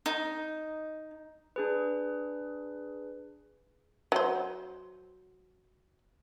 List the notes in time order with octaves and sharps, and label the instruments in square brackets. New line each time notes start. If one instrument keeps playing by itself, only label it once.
[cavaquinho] D#4
[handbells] D4 G#4 B4
[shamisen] F#3 C5